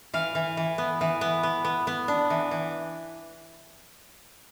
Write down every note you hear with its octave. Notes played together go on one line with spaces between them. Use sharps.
E3 F5
E3
E3
B3
E3
B3
B3
B3
B3
D4
E3
E3